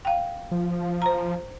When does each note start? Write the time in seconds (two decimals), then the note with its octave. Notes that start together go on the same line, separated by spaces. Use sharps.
0.05 F5 G5
0.51 F3
1.02 C5 A#5